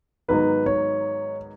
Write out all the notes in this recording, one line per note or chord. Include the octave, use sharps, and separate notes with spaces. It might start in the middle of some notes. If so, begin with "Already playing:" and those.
G#2 D#3 F#3 B3 D#4 B4
C#5